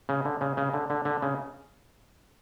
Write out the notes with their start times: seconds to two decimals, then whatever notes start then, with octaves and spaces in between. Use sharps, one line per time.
0.09 C#3
0.25 D3
0.41 C#3
0.57 C#3
0.74 D3
0.90 D3
1.05 D3
1.22 C#3